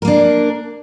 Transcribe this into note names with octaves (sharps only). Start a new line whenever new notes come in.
A#3 D4 A#4